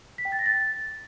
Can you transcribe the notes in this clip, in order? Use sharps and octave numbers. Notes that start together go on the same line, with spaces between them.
B6
G5
A6
A#6
A6